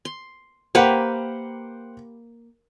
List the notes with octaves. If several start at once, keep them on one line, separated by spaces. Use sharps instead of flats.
C6
A#3 G4 B4 C5 F#5 G5